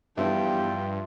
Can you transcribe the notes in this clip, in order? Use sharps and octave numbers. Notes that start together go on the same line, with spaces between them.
E2 G2 F3 F4 G4 E5 G5